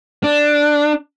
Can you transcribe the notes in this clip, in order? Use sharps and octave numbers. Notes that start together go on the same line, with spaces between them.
D4